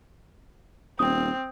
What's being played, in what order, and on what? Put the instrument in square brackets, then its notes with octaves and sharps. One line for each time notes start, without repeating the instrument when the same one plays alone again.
[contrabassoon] D#1 [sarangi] C4 [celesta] D#6